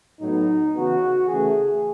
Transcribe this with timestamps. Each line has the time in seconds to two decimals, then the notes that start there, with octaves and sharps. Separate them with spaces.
0.21 A2 F#3 B3 D#4
0.74 C#3 E3 B3 F#4
1.28 C#3 E3 A3 G#4